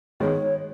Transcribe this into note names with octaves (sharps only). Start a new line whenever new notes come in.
D#3 G#3 B3 C#5